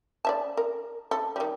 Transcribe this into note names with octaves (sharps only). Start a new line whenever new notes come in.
D5 E5 A5
A#4
A4
D#3 G3